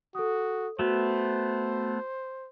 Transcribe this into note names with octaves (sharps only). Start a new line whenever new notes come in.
F#4 A4 D#6
A3 B3 F#4 C5